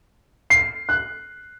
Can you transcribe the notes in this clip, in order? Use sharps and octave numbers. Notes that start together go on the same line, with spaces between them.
C7
F#6